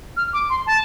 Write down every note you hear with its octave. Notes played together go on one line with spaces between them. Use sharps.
F6
D6
C6
A5